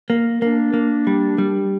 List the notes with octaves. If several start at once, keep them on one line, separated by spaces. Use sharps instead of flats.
A#3
A#3 D4
A#3
G3
G3